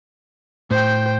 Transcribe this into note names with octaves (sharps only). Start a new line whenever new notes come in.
A2 C5 G5